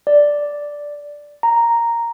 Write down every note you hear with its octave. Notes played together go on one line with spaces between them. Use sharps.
D5
A#5